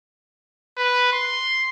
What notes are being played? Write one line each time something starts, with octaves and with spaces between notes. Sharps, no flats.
B4
C6